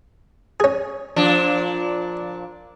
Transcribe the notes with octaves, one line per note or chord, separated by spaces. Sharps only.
C#4 G#4
A#2 F3 D4